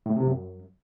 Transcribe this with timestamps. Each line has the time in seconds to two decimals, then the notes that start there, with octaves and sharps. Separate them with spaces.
0.06 A2
0.16 C3
0.27 F#2